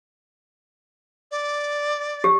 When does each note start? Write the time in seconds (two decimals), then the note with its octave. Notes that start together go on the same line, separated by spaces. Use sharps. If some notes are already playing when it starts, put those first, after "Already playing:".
1.31 D5
2.24 G4